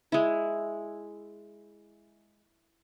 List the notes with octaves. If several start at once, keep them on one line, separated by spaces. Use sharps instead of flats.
G#3 E4